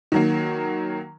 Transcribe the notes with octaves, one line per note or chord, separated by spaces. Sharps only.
D#3 F#3 A#3